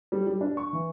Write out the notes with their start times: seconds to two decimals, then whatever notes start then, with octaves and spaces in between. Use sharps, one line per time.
0.12 G3
0.27 G3
0.41 D4
0.57 C#6
0.73 E3